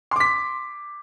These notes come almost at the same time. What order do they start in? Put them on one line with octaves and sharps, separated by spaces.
C6 D6 B6